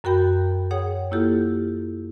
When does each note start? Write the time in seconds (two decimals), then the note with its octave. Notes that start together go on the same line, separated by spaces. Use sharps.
0.04 F#2 F#4 A#4 G5 B5 G6
0.71 G#4 C#5 F#5 G5 D#6
1.11 A#3 E4 F4 G4 A4